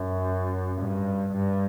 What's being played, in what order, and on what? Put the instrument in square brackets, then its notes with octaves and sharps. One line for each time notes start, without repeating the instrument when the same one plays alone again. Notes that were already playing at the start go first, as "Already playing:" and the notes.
Already playing: [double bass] F#2
G2
G2